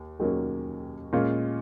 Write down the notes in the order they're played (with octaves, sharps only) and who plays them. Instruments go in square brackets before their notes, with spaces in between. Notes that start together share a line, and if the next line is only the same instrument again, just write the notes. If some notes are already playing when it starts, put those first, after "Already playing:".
Already playing: [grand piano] D#2
D#2 D#3 F#3 A#3 C#4
A#2 G#3 C#4 F4